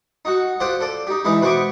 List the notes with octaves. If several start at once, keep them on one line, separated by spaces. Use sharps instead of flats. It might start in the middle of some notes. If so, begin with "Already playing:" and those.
D#4 F#4
F4 G4 C5 D5 F#5
A4 D5
D#4 G4
E3 G#3 D#4 E4
B2 B4 C5 B5 C#6 D6